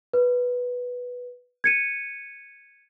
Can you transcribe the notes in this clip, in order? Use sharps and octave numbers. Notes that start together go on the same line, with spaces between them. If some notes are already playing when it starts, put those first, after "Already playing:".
B4
G#6 C#7 D#7